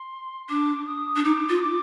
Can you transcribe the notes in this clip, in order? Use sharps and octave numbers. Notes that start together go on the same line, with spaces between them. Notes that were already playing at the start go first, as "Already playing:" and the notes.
Already playing: C6
D4 D6
D#6
D4
D#4 D6
F4
D#6
D6